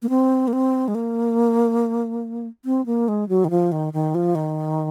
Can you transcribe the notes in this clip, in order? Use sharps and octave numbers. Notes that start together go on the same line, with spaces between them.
A#3
C4
A#3
C4
G#3
A#3
C4
A#3
G#3
F#3
D#3
F3
D#3
D#3
F3
D#3